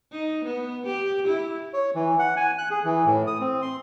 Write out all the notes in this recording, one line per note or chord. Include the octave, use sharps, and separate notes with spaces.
D#4
B3
G4
E4
C#5
E3
F#5
G#5
F#6
G#4
E3
A2
D#6
C4
C6